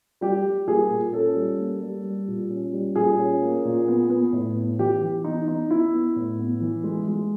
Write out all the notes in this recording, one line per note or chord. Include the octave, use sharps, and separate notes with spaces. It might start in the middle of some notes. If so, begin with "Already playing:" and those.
G3 G4
G3
A#3 G#4
A#2
C#4 A4
G3
A#3
G3
G3
A#2
C#4
G3
A#2 G#4
C#4
A#3
A#2
B3
B3
A2
B3
E3 G4
E3
B3 D#4
B3 D#4
B3 E4
B3
A2
B3
E3
G#3
G#3